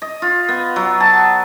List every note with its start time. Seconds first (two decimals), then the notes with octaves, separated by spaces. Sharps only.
0.02 D#5
0.22 F4
0.48 B3
0.76 F#3
1.00 A5